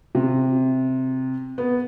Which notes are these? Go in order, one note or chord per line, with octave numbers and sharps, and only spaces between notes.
C3
B3